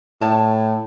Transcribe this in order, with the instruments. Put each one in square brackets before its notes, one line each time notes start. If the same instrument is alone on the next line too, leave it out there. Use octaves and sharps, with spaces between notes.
[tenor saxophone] A2 [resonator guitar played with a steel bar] C#5 A5